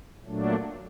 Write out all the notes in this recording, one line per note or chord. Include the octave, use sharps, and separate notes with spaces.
A#2 F#3 A3 D4